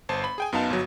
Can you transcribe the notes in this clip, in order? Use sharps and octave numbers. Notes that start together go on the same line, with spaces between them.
G1 C5 A5
B5
G#4 G5 G#5
F#2 B3 D#4 F5 A5
G1 F#3